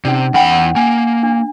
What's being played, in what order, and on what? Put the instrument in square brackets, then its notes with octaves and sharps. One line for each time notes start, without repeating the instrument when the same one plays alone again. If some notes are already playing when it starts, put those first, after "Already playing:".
[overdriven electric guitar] C3 [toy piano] C#4 D#4 D5
[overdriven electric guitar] E2 B5 [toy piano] F#5 G5
[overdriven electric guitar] A#3 [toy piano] G#5
[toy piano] D4